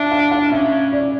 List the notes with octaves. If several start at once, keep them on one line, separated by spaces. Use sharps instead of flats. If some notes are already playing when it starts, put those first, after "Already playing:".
Already playing: D4 E5
F5
F5
C#4 E5
D5